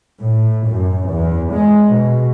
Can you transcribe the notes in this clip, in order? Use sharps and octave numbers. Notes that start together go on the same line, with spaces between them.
A2
F#2
E2
G#3
B2